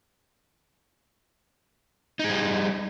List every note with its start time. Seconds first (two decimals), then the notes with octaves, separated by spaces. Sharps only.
2.19 D#4
2.24 G#4
2.29 G3